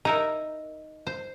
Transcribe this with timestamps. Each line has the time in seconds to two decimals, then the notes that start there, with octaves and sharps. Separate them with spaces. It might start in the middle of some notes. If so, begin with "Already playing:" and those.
0.05 D#4 E4 A#4 A#5
1.07 C5